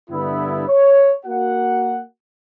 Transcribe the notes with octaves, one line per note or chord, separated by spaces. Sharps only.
G2 D3 B3 E4
C#5
A#3 F#4 F#5